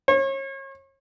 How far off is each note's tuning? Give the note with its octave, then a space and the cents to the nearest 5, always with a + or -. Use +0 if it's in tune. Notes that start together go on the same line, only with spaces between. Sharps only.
C#5 -35